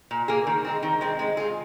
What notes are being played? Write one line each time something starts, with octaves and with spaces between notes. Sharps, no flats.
A#2
A#3 G#4
D#3
G#3 C4
D#3
G#3 C4
G#3
F4 G#4